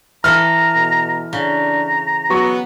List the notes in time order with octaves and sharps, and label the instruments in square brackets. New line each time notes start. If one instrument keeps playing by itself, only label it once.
[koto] E3 A4 [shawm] A#5 [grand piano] F6
[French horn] B2
[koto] C#3 [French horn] D4 [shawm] A#5
[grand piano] F#3 C#6 [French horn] B3